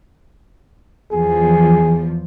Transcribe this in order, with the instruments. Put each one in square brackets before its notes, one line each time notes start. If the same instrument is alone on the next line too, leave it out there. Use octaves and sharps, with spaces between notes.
[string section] E2 F3 [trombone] G#4